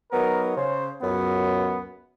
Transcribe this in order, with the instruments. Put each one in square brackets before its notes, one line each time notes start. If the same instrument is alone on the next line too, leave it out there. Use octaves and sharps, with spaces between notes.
[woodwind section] D#3 F#3 B3 [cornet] A#4
[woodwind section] C#3 [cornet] C5
[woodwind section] C#2 F#2 [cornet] B3